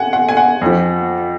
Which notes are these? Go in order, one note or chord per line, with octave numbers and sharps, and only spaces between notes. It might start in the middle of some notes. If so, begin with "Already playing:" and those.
Already playing: F#5 G#5
F#5
G#5
F#5
F2 F3